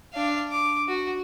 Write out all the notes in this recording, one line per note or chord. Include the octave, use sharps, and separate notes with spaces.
D4 F5
D6
F#4